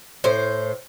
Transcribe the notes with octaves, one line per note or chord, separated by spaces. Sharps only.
A2 C5